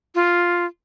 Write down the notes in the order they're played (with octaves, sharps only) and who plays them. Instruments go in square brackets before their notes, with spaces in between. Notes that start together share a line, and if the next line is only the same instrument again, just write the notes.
[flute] F4